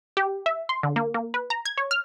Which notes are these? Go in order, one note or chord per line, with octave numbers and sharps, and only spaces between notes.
G4
E5
C6
D3
A#3
A#3
B4
A#5
G#6
C#5
F6